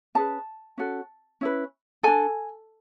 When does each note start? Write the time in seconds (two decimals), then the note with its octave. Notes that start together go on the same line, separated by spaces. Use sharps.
0.15 C#4 G#4 B4 A5
0.78 C#4 F#4 A4
1.41 C#4 E4 B4
2.03 D4 A4 G#5